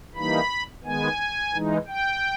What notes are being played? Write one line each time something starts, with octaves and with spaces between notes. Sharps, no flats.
E3 G3 A#3 D#4 B5
D#3 G#3 B3 G#5
E3 G#3 D#4
G5